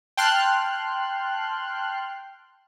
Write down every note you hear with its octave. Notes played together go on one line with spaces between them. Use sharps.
G5 A5 C6 F6 F#6